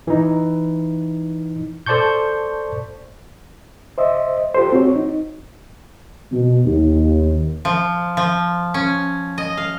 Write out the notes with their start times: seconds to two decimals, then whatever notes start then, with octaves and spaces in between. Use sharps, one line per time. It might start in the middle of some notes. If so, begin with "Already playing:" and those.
0.07 E3 D#4
1.86 A4 C5 D5 A5 C#6 G6
3.98 C5 D#5 E5
4.55 F4 G4 A4 C5
4.73 C4 F#4 C#5
4.96 D#4
6.31 B2
6.65 D#2
7.65 F3
8.17 F3
8.74 C#4
9.38 D#5
9.57 F5